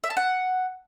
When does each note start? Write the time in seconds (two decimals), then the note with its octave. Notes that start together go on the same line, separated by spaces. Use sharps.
0.04 E5
0.10 A5
0.17 F#5